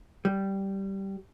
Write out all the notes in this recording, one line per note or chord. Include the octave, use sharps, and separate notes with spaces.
G3